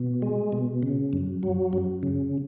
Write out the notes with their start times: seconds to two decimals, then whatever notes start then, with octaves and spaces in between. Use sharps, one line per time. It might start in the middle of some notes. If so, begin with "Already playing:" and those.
Already playing: B2
0.22 G#3
0.52 B2
0.82 C#3
1.13 F#2
1.43 F#3
1.73 F#2
2.03 C#3